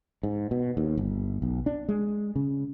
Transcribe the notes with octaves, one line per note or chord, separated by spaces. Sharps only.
G#2
B2
D#2
G1
B1
D4
G#3
C#3